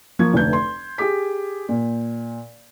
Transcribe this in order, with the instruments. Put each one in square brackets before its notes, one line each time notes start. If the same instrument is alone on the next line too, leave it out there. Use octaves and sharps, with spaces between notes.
[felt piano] F3 A#3 C#6 G#6
F1 D2 A3 B4 G6
C6
G4 G#4 D6 B6
A#2